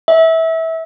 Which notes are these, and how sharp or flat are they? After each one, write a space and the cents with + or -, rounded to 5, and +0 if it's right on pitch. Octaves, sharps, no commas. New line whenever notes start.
E5 -20